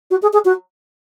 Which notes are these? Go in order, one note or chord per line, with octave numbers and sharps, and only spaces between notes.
F#4
G#4
G#4
F#4